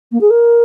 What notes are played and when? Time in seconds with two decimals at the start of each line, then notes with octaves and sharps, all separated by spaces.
0.12 A#3
0.21 G#4
0.30 A#4